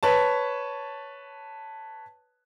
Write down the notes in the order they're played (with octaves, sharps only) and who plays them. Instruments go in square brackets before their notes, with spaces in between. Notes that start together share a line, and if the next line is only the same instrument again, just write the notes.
[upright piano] B4 C#5 A5